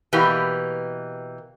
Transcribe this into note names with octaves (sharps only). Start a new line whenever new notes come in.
B2 E3 A#3 G4